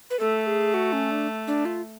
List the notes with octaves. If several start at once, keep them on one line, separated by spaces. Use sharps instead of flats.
B4
A3 A4
G#4
F#4
C#4
D4
D4
F4